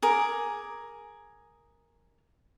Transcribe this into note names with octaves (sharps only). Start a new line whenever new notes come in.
G#4 A#4 D6